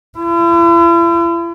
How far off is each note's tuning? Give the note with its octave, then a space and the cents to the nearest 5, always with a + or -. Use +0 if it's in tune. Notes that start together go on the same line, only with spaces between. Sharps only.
E4 +40